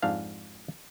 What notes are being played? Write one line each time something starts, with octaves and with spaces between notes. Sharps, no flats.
F2 G#2 D4 F5